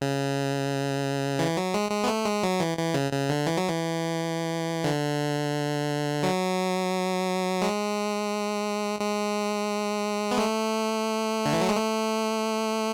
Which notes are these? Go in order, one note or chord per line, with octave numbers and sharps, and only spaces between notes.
C#3
E3
F#3
G#3
G#3
B3
A3
G#3
F#3
E3
E3
C#3
C#3
D3
E3
F#3
E3
D3
F#3
G#3
G#3
B3
A3
D3
E3
F#3
G#3
A3